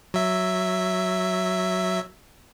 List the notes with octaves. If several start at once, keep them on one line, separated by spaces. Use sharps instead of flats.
F#3 E5